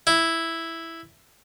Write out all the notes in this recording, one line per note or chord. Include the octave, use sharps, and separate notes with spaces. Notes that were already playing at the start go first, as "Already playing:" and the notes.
E4